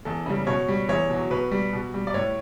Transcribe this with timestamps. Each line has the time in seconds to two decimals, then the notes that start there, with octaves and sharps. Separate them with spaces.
0.05 E2 A4
0.26 C#3 G3
0.47 B2 C#5
0.68 G3
0.89 E2 C#5
1.10 B2 F#3
1.31 B2 B4
1.51 G3
1.73 B2
1.94 G3
2.07 D5
2.14 A2 C#5